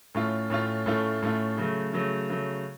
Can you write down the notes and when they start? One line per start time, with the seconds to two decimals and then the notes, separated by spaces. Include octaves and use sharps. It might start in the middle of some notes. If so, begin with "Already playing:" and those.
0.15 A2 A3 C#4 F4
0.50 A2 A3 C#4 F4
0.86 A2 A3 C#4 F4
1.22 A2 A3 C#4 F4
1.57 C#3 F#3 A3
1.93 C#3 F#3 A3
2.30 C#3 F#3 A3